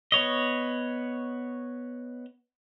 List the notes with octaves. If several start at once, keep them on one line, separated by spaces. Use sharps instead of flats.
B3 C#5 D#5